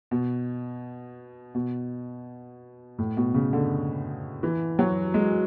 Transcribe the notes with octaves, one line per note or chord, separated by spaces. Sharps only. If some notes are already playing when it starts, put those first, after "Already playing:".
B2
B2
A2
B2
C#3
D3
E3
F#3
G#3